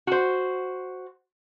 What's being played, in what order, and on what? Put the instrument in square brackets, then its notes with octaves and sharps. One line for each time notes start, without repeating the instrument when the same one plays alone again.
[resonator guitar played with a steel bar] F#4 C5